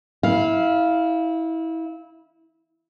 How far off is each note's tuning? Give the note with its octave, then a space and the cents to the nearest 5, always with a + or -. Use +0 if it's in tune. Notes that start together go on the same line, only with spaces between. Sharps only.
E4 -25 F5 +0